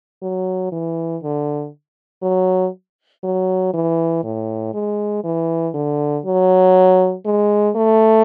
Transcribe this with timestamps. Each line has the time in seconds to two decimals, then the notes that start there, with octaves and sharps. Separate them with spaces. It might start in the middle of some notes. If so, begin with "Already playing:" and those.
0.22 F#3
0.72 E3
1.23 D3
2.23 F#3
3.24 F#3
3.74 E3
4.24 A2
4.74 G#3
5.24 E3
5.74 D3
6.25 F#3
7.25 G#3
7.76 A3